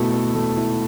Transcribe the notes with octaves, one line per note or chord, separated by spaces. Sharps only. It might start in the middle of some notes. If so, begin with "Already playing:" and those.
Already playing: B2 A3 E4 A4
A4
A3
E4